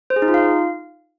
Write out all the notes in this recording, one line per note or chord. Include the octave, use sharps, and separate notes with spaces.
C5
G#4
D#4
F4
F5